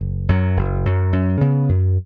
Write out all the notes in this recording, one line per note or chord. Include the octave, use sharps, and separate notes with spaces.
F#1
F#2 F#3
F#1
F#2 F#3
F#2
C#3 B3
F#2